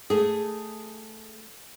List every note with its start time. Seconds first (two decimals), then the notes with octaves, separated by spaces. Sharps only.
0.10 A3 G#4